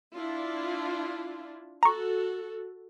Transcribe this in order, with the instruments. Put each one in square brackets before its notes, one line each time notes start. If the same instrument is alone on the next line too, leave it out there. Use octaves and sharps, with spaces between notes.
[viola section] D4 E4 F4
[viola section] F#4 A4 [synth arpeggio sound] A#5 C#6